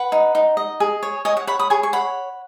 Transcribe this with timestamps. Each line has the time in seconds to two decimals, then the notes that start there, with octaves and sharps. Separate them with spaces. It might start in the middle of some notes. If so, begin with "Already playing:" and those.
Already playing: B4 F#5
0.12 D#4
0.35 D#4
0.57 D#5
0.80 G#4
1.03 C#5
1.25 C#5 D#5 G#5
1.37 F#5
1.47 C#5 F#5 B5
1.59 B5 D#6
1.70 G#4 G#5 C#6
1.83 C#6
1.93 C#5 F#5 B5